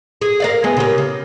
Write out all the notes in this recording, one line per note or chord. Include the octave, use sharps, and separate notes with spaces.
G#4
A#4 D5 F5
G#3 B3
C#3 G4 A#4
C#3